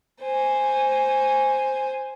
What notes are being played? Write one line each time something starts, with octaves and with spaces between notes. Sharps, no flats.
C5 G#5